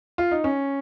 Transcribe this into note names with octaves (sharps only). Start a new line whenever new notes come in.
F4
D#4
C#4